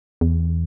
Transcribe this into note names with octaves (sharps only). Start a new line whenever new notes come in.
E2